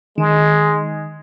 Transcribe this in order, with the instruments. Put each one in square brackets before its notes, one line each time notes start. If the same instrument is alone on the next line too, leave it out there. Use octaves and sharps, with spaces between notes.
[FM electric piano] D#3 [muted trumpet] G#3